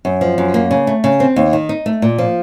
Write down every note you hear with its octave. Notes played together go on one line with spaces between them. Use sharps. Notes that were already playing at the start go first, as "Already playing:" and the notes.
F#2
F3
F#2
A#3
C#3
A3
C#3
C4
D#2
D#3
D#4
A3
A#2
F3